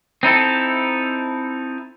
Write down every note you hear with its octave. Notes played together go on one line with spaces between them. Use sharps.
C4 D#4 E4 A4